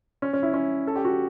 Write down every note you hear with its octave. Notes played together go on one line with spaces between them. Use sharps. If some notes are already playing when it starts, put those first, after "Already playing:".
C#4
C#4
E4
C#4
A4
G4
F#4